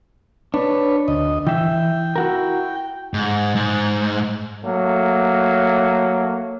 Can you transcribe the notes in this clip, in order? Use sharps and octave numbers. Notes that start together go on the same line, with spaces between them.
D4 B4 C#5
D2 D#5
E3 E5 G5
E4 F#4 A#4
G#2
G#2
F#3 A3 A#3